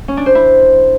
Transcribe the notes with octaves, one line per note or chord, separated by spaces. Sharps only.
C#4
D4
C5
E4